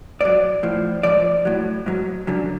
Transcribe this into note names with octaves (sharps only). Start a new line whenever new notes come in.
G#2 F#3 D5
A2 F3
G#2 F3 D5
A2 F#3
G#2 F#3
F#2 D3 F#3